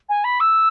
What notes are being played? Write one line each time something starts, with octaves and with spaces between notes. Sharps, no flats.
G#5
B5
E6